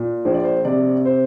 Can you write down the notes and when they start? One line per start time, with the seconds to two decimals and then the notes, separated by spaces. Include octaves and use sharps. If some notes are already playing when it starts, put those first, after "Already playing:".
Already playing: A#2
0.25 A#1 C5
0.34 D5
0.43 C5
0.65 C3 D5
1.05 C5